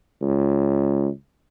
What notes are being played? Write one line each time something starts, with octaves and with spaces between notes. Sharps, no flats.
C#2